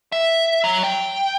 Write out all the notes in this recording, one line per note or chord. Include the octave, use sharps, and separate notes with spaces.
E5
F#3
G5